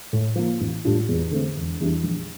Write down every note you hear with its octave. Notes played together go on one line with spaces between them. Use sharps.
A2
F3 A#3
A1
A2 G3 D4 F4
E2
D3 A3 C4
E1
E2 E3 G3 D4
A#1